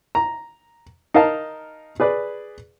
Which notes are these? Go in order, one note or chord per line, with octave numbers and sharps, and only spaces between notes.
A#5
D#4 A#4 F5 A5
G#4 B4 D5